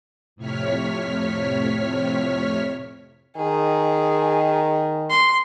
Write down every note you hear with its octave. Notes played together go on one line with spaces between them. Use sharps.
F2 A2 C3 C#5 F6 B6
D#3 G#4
C6